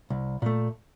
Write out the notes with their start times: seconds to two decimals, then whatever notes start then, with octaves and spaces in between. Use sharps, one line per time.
0.10 C2
0.42 A#2 A3